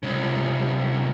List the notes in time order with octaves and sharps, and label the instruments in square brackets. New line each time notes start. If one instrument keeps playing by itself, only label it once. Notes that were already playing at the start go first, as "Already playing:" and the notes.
[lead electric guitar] C2 C#3